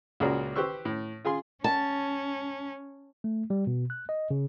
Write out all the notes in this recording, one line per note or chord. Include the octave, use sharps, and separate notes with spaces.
C#2 A#2 F#4 G#4 A#4 D5
G4 B4 C5 C#6 E6
A2
F4 G#4 G#5 C6
C#4 A5
A3
G3
B2
F#6
D#5
C#3